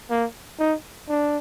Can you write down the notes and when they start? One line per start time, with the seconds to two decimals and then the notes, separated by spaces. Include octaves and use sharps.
0.11 A#3
0.59 D#4
1.09 D4